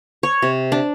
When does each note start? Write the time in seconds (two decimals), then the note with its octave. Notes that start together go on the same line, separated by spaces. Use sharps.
0.23 C#5
0.42 C3
0.72 D4